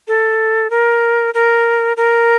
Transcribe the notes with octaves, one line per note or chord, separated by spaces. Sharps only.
A4
A#4
A#4
A#4